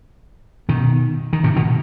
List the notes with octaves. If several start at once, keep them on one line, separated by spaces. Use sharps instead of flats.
B2 D#3
D#3
A2 C3
B2 D#3